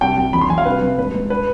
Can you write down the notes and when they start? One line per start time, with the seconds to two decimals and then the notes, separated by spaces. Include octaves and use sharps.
0.01 C2 G5
0.17 C2
0.33 F2 B5
0.41 C6
0.50 F2 G#5
0.58 F5
0.65 C2 B4
0.82 C2
0.98 G#2 B4
1.14 G#2
1.30 B4